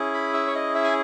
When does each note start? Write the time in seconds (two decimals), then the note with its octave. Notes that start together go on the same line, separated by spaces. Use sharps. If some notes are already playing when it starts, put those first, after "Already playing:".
Already playing: C#4 E4 G#4
0.14 B5
0.34 E5
0.47 C#5
0.55 D#5
0.75 E5
0.84 G#5